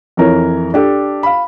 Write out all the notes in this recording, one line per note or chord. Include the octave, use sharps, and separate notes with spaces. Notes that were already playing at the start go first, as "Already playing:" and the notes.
F2 E3 A#4 C#5
D4 G4 A4
F5 B5